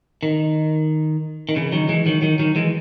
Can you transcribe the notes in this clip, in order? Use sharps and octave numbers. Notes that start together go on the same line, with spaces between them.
D#3
D#3
C#3 E3
D#3 F#3
E3 G#3
D#3 F#3
D#3 F#3
D#3 F#3
E3 G#3